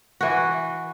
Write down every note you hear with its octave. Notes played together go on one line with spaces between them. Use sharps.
E3 F#4